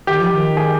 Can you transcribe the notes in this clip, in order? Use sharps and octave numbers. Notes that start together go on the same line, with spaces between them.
D#3 G4
F3
D#3
G#4